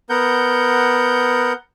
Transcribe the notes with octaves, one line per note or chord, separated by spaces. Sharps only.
B3 A#4 F#5 G6